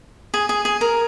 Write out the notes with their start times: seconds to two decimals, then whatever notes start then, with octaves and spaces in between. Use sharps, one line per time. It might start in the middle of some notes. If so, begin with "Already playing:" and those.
0.34 G#4
0.49 G#4
0.65 G#4
0.81 A#4